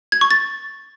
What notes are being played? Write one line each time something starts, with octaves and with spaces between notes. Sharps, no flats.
G#6
C#6
A6